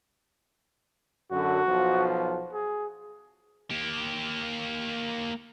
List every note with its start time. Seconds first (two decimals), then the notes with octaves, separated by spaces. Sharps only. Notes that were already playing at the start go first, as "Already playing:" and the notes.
1.32 F#2 D3 F#4
1.68 B1 B2 F3
2.53 G#4
3.71 A#3 G4